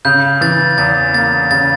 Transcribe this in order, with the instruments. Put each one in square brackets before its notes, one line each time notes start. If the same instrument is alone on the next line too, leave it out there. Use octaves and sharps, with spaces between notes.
[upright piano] C#3 [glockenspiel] G6
[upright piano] E3 [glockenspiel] A6
[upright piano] E2 [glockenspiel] A6
[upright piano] A#3 [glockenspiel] A6
[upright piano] C#3 [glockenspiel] A6